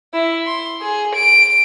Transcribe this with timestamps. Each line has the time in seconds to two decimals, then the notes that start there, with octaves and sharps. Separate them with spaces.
0.14 E4
0.46 C6
0.82 G#4
1.15 D7